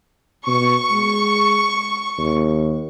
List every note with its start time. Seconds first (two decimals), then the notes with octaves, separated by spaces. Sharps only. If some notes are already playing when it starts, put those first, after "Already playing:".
0.47 B2 C#6
0.91 G#3
2.18 D#2